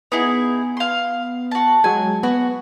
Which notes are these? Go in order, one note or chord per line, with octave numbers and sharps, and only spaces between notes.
B3 D#4 E4 G#4
F5 C6
F#4 A5
F#3 G#3 G#5
B3 F#4